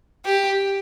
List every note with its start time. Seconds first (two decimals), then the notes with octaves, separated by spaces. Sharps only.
0.25 G4